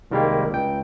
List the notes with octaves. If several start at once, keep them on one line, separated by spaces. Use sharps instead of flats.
C2 D#3 G3 G#3 A#3
C#2 G5